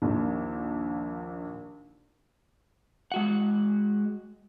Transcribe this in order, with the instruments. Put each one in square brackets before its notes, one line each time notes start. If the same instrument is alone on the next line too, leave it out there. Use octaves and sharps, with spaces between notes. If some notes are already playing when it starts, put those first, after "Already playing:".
[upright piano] A#1 D#2
[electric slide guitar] G#3 F#4 F#5